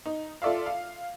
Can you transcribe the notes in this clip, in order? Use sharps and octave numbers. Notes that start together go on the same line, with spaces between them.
D#4
F4 A4 D5 E5 F5
F5